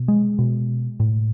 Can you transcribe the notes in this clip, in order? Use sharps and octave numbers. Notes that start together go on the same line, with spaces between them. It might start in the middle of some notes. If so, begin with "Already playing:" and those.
Already playing: B2
G#3
B2
A2